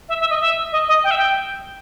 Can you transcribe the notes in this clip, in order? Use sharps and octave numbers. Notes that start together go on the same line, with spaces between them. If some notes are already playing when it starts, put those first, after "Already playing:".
E5
E5
D#5
E5
D#5
D#5
G5
E5
G5